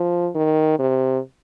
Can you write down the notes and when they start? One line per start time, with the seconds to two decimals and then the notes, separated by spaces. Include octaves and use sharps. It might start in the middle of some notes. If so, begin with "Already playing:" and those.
Already playing: F3
0.35 D#3
0.79 C3